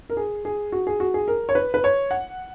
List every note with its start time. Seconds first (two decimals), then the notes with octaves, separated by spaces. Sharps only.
0.10 A#4
0.17 G#4
0.45 G#4
0.72 F#4
0.87 G#4
1.00 F#4
1.14 G#4
1.28 A#4
1.49 C#5
1.55 B4
1.74 B4
1.84 C#5
2.11 F#5